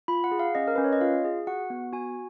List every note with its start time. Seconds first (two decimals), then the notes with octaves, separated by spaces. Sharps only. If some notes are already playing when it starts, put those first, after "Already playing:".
0.08 F4 B5
0.24 F#5
0.31 G#4
0.39 F5
0.55 C#4 D#5
0.68 A#4
0.76 C#4 B4
0.84 C#5
0.93 D#5
1.01 F4 F5
1.25 G#4
1.47 F#4 F#5
1.70 B3
1.93 F#4 G#5